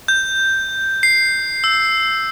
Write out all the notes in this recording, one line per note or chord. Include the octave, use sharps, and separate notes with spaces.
G6
C7
E6